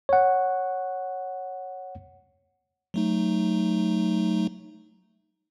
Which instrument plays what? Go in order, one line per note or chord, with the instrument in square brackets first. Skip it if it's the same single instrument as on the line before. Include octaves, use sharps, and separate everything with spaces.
[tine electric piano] C#5 F#5
[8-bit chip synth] F#3 A3 D#4